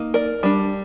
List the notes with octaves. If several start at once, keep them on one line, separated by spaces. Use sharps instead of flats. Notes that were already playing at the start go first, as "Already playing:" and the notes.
Already playing: A#3 D#4
A#4 D5
G3 D4